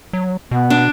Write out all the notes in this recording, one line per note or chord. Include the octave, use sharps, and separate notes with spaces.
F#3
B2 B3
D4